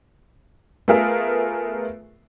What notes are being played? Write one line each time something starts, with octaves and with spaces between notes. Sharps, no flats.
A3 B3 F4 G#4 A#4 E5